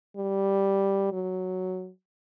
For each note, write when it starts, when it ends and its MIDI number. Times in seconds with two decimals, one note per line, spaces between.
0.17 1.11 55
1.12 1.89 54